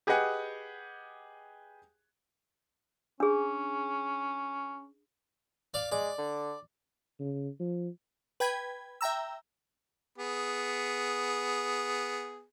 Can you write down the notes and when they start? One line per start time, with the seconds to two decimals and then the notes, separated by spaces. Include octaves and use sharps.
0.07 G4 G#4 B4 D#5 F#5 G#5
3.20 C#4 D4 G#4
5.74 D5 F5
5.91 G#3 D5
6.18 D3
7.19 C#3
7.60 F3
8.40 B4 G5 B5 G#6
9.01 E5 G5 A#5 E6
10.18 B3 G#4